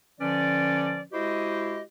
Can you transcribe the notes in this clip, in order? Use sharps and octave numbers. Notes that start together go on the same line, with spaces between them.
D3 F3 C#4 B4 D5
G#3 E4 F#4 G4 C5 D#5